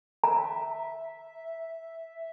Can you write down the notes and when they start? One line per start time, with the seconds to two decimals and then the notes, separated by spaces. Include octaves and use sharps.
0.24 E5 A#5